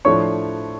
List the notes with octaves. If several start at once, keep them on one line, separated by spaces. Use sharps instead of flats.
A2 F3 A3 D4 C#5 C#6